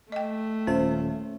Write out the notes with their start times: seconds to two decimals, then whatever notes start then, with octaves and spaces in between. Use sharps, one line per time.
0.12 A3 D#5 G5
0.67 D#1 C#4 F4 C5 E5